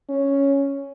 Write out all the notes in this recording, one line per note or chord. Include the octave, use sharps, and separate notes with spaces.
C#4